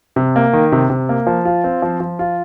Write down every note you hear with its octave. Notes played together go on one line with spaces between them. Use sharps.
C3
A#3
D#3
C3
C3
A#3
F3
F4
C4
F3
F3
F4